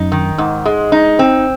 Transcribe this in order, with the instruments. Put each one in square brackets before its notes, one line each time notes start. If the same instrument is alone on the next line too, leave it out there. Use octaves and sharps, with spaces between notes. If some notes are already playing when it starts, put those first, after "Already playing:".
Already playing: [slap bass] F#2 [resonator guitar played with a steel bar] D#4
[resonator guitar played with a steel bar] D#3
G#2
G#3
D#4
C4